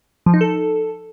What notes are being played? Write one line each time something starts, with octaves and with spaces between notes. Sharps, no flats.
F3
D#4
A4